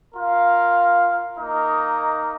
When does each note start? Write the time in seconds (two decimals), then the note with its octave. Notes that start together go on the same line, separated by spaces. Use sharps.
0.14 F4 A#4 F5
1.39 A#3 D#4 A#4 D#5